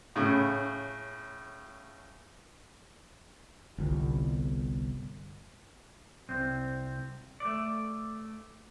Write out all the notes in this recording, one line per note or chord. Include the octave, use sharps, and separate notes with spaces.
A2 C#3
G1 C2
C2 C4
A3 D5